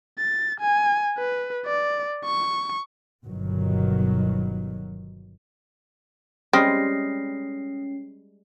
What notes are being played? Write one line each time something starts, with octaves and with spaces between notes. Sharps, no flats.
A6
G#5
B4
D5
C#6
G1 B2 D#3 F#3
G3 G#3 C4 C#4 D#6 F6 A#6 C7